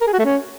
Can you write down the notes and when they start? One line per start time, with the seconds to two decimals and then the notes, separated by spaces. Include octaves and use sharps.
0.01 A#4
0.07 G#4
0.13 F#4
0.19 A3
0.25 C#4